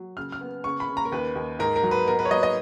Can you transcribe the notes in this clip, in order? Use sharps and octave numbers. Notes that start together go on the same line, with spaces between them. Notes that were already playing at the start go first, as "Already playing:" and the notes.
Already playing: F#3
C#3 F6
F6
B3
C#3 C#6
B5
C#3
A#5
A#4
D#2 B4
D#2
G#2 A#4
A#4
F#3
B4
B3 A#4
B4
C#5
F#3 D#5
D#5